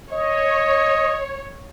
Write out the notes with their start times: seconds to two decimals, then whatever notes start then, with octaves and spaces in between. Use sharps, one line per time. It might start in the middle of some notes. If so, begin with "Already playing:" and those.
0.13 C#5 D#5